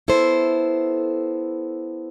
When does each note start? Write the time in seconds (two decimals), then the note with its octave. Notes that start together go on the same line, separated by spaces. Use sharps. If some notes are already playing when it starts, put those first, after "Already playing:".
0.08 B3 E4 A4 C5